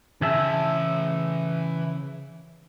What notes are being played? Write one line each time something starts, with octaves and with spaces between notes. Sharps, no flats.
C#3 E3 G#4 E5 A5